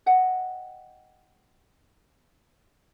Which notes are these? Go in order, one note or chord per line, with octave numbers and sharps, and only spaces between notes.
D#5 F#5 G5